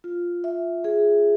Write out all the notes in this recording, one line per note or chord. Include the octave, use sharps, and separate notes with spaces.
F4
E5
G#4